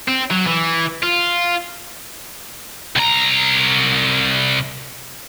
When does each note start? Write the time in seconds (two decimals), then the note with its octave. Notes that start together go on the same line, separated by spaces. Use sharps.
0.08 C4
0.31 F#3
0.46 E3
1.03 F4
2.96 C2 A#5